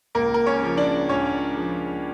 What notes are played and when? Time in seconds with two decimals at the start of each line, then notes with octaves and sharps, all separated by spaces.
0.15 C#2 A#3 A#4
0.34 A#4
0.46 C#4 C#5
0.61 C#3 F3
0.77 D4 D5
1.09 C#2 C#4 C#5
1.55 C#3 F3